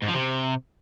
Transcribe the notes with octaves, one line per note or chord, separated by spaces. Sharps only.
G#2
F3
C3